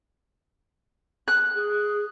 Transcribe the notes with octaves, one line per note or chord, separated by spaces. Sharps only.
F#6
G#4